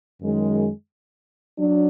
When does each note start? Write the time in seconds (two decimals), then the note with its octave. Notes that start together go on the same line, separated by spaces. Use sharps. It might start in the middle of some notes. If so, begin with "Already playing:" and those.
0.21 F#2 D#3 G#3
1.57 F#3 D4